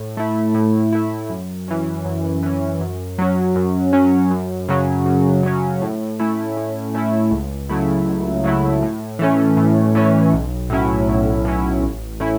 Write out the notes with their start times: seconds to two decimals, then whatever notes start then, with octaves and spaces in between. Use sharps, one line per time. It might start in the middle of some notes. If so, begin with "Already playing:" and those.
Already playing: A2
0.17 A3 E4
0.54 A2
0.93 A3 E4
1.30 F#2
1.68 E3 C#4
2.05 F#2
2.43 E3 C#4
2.80 F#2
3.18 F#3 C#4
3.56 F#2
3.93 F#3 C#4
4.31 F#2
4.68 C#3 F#3 C#4
5.06 F#2
5.43 C#3 F#3 C#4
5.82 A2
6.19 A3 C#4 E4
6.57 A2
6.95 A3 C#4 E4
7.31 C#2
7.69 C#3 F#3 A3 E4
8.06 C#2
8.44 C#3 F#3 A3 E4
8.82 A2
9.19 E3 A3 C#4
9.57 A2
9.95 E3 A3 C#4
10.33 B1
10.70 A2 F#3 C#4 E4
11.08 B1
11.45 A2 F#3 C#4 E4
11.83 A1
12.20 A2 A3 C#4 E4